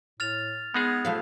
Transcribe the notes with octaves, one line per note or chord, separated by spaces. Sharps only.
A2 F6 A6 F7
G#3 B3 D#4 G#4
F3 A3 F5